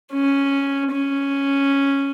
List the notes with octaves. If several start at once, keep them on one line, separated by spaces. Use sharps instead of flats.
C#4
C#4